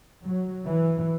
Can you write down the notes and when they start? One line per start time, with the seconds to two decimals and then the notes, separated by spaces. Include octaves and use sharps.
0.24 F#3
0.67 E3